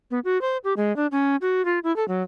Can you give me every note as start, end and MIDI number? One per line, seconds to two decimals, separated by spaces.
0.11 0.19 59
0.25 0.40 66
0.41 0.57 72
0.64 0.74 67
0.77 0.95 56
0.96 1.07 62
1.12 1.36 61
1.42 1.65 66
1.65 1.79 65
1.84 1.94 64
1.96 2.07 69
2.08 2.23 54